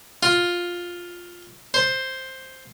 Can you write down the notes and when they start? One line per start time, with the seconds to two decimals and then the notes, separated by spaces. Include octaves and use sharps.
0.23 F4
1.74 C5